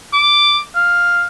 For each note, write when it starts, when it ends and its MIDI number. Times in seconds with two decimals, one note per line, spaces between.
0.13 0.61 86
0.75 1.26 77